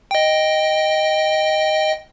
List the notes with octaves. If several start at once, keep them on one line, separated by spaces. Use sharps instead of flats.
D#5 G5